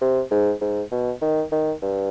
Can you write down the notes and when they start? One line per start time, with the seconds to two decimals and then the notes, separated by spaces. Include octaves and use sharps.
0.01 C3
0.31 G#2
0.61 G#2
0.91 B2
1.22 D#3
1.52 D#3
1.82 G2